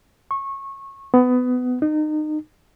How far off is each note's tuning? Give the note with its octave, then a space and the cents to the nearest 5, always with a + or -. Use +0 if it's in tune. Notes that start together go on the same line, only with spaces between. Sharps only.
C#6 -20
B3 +20
D#4 -30